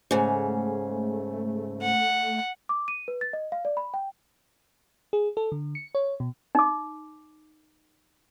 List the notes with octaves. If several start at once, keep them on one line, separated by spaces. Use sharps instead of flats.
G#2 C#3 A3
F#5
D6
D#7
B4
A6
D#5
F5
D5
B5
G5
G#4
A4
D3
C#7
C#5
B2
D#4 D6